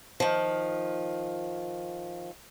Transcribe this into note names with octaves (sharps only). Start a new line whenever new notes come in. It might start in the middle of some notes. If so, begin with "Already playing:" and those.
D#3 F3